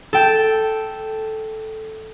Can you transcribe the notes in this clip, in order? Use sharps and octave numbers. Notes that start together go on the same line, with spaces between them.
A4 G5